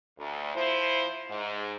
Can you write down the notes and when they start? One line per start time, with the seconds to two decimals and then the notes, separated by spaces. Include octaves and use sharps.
0.18 D2
0.54 F3 E4 C5
1.28 G#2